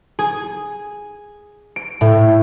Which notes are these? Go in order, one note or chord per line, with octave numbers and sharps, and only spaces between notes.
G#4
D7
A2